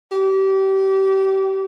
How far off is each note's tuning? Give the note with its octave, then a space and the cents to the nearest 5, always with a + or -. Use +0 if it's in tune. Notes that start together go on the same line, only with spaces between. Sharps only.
G4 -25